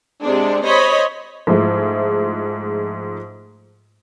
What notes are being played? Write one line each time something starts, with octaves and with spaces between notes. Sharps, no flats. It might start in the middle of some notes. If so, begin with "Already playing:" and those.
C3 G#3 D4
C5 C#5 D#5 B5
G#2 F3 G#3 A3 E4